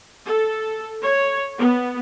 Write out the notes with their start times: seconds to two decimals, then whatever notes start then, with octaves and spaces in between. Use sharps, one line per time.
0.23 A4
1.02 C#5
1.59 B3